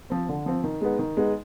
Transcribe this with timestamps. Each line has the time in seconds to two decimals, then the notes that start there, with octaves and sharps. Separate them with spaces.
0.10 F3 C4
0.29 D3
0.46 F3 C4
0.64 D#3
0.81 G#3 B3 D#4
0.99 D#3
1.17 G#3 B3 D#4